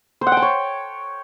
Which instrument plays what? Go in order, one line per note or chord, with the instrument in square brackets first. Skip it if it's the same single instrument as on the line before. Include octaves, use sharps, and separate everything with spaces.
[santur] C5
F#5
G5
A5
C#5